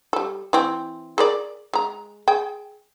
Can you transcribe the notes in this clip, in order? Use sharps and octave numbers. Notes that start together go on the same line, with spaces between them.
G3 A4
E3 C4
G#4 A#4 D5
G#3 A#5
G#4 G5